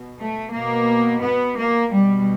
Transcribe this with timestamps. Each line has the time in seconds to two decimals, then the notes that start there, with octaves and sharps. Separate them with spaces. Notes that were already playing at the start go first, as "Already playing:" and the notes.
Already playing: B2
0.19 A3
0.53 B2 A#3
1.22 B3
1.57 A#3
1.92 B2 G3